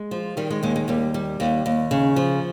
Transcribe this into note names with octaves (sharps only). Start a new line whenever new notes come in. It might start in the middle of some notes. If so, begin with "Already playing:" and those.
Already playing: G#3
F3
D#3 G3
G#3
D#2 G#3
G#3
D#2 G3
G3
D#2
D#2
C#3
F3